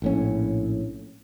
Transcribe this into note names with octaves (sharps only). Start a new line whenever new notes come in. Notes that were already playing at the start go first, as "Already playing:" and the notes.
A#1 A2 C#4